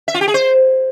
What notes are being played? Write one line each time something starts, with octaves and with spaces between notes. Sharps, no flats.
E5
F4
G4
G#4
C5